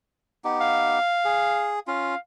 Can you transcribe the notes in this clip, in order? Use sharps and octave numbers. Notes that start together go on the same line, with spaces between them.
B3 D#4 G4
F5
G#4
C#4 F4 F5